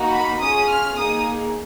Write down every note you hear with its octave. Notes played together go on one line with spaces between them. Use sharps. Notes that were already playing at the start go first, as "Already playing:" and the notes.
Already playing: A#3 D#4 F#4
B5
C#4 F4 G#4 D#6
F6
A#3 D#4 G#4 D#6